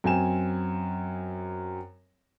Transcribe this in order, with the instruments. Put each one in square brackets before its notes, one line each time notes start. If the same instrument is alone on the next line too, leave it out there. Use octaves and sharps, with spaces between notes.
[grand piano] F#2 C4 G#5 E7